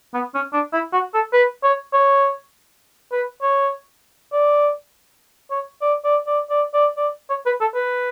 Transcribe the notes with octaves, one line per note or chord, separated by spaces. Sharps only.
B3
C#4
D4
E4
F#4
A4
B4
C#5
C#5
B4
C#5
D5
C#5
D5
D5
D5
D5
D5
D5
C#5
B4
A4
B4